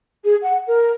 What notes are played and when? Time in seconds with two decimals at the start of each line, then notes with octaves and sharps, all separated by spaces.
0.24 G#4
0.42 F#5
0.67 A#4